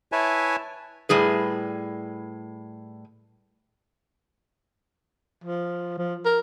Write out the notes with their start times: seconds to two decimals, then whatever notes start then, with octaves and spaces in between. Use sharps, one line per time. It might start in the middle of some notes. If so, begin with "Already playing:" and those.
0.12 E4 B4 C#5 E5 G#5 A5
1.09 A2 G3 G#4 B4
5.44 F3
5.98 F3
6.25 A#4